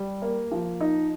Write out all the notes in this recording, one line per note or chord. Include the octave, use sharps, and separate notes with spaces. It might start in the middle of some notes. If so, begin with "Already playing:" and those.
Already playing: G3
A#3
F3
D#4